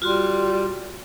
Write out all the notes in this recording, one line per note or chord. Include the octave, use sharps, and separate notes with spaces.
G3 F4 F#4 C6